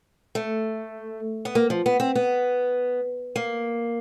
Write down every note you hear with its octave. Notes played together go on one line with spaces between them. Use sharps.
A3
B3
A#3
F3
B3
C4
B3
A#3